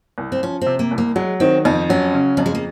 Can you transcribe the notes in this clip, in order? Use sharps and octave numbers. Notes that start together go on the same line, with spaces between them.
C2
C4
F3 C#4
C3 C4
A#3
C2
A#3
F#3 G#3
D#3 C4
F2 D#4
F#3 C#4
C#3
F2 F#3
G#3
A#3